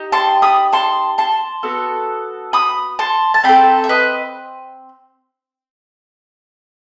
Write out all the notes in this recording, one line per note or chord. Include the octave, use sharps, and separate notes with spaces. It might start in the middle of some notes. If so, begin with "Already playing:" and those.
Already playing: D#4 G4
A5 C6
B5 D#6
A5 C6
A5 C6
B3 F#4 A4
B5 D#6
A5 C6
A5
C4 D#4 A4 G5 B5
E5
B4 D#5